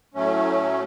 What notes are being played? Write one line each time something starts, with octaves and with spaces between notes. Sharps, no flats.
A2 F#3 A3 C#4